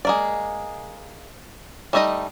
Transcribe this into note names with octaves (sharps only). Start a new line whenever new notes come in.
G#3 A#3 D5
G3 A3 D#4 E4 D#5